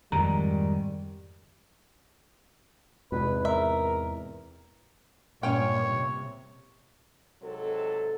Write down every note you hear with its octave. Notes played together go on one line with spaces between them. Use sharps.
F2 G#2 D#3 G3 A#5
E2 G#2 C3 B4
A#4 E5
G2 A#2 C#4 C#5 G5
C3
G#2 C3 F#3 A4